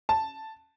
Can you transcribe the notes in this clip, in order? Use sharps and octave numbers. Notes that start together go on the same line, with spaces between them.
A5